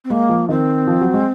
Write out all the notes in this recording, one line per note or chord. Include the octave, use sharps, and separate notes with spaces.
C4
G#3 A#3
F3
D#3 C4
F3
F#3
G#3